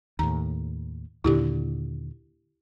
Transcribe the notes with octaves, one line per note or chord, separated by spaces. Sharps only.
D#2 A2 A#5
D#2 A#2 D3 E4 G4